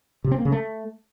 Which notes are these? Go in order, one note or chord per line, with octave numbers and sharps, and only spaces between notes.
C3
C4
A#3
C#3
A3